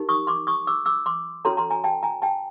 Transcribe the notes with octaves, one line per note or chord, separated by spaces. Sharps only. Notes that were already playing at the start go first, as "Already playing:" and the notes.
Already playing: D#4 G4 A#4
C#6 D#6
C6 D6
C#6 D#6
D6 E6
D6 E6
C6 D6
C#4 F#4 A4 C#5 A#5 C6
A#5 C6
G#5 A#5
G5 A5
G#5 A#5
G5 A5